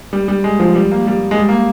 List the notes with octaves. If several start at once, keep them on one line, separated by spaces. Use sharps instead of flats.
G3
G3
G#3
F3
G3
A#3
G3
G#3
G3
A#3